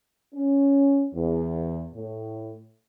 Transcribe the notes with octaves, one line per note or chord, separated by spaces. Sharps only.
C#4
E2
A2